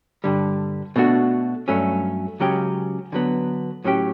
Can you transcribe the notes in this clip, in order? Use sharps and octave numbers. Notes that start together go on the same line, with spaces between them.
G2 D3 G3
B2 A3 D4 F#4
G2 F#3 A3 C#4
C#2 C#3 F#3 C#4 G4
D3 F#3 B3
A2 F#3 C#4 G4